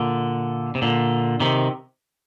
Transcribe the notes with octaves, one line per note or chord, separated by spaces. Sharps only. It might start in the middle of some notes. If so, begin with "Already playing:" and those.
Already playing: A#2 D3
C3
A#2 D3
C3 D#3